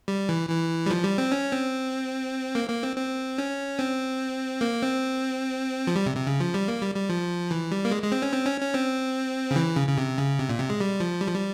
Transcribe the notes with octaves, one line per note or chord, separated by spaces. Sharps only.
G3
E3
E3
G3
F3
G3
C4
C#4
C4
A#3
A#3
C4
C4
C#4
C4
A#3
C4
F3
G3
C3
C3
C#3
F3
G3
A#3
G3
G3
F3
E3
G3
A#3
G#3
G#3
C4
C#4
C4
C#4
C#4
C4
C#3
E3
C#3
C#3
C3
C#3
C3
A#2
C3
G#3
G3
F3
G3
F3
G3